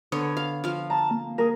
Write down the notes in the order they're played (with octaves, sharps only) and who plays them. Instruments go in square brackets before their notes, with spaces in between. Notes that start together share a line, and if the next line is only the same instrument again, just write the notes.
[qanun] D3 B3 C#5
F5
F3 F5
[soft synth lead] A5 [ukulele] A#5
[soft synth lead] A#3
[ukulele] G#4 A#4